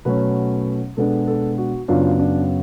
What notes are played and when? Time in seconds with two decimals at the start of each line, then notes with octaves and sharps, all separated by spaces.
0.05 B2 F#3 A3 C#4 B4
0.97 B2 G#3 B3 D4 A4
1.27 A4
1.58 F#4
1.88 F#2 C#3 F#3 B3 D4 F4
2.19 D4